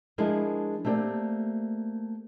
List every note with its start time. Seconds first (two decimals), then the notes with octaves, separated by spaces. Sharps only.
0.18 F3 G#3 D4 E4 G#4 A#4
0.85 A3 A#3 C4 G4 D5